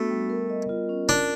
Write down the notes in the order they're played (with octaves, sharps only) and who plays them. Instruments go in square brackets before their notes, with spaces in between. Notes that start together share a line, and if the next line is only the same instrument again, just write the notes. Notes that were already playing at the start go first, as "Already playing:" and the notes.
Already playing: [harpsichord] A3 [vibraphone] B3 D4 F#4
[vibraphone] G3
A#4
D#5
F4
C#4
[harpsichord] D4 [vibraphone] A#4